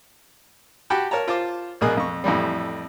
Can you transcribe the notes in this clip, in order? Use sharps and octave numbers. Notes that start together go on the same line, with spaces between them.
F#4 G4 F#5 G5 A5 B5
A#4 C#5 A5 A#5
F4 C5 A5 D6
A#1 B2 A#3 G#4 D#6 F#6
F2 C#6
F2 A2 E3 G3